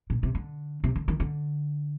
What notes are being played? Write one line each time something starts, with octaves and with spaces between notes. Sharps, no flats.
A#2
C3
D3
C3
D3
D#3
D3